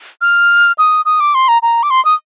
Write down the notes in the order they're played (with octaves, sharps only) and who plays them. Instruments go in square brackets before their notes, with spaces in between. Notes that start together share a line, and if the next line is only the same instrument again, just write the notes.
[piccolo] F6
D#6
D#6
D6
C6
A#5
A#5
D6
C6
D#6